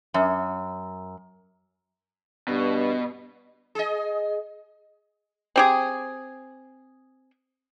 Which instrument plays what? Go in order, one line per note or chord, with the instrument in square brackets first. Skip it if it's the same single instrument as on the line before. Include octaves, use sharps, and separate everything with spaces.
[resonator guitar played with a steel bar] F#2
[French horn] G2 [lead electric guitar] B2
[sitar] G#4 D#5
[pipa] C4 G4 G#4